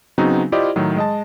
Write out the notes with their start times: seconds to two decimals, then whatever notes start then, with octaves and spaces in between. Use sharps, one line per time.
0.18 C#3 F#3 B3 C4 D#4 F#4
0.52 E4 F4 G4 C5 D5 D#5
0.76 A2 D#3 F#3
0.97 G#3 D#5 A5